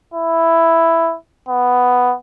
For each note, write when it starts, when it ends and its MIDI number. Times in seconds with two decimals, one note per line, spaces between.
0.14 1.15 64
1.49 2.15 59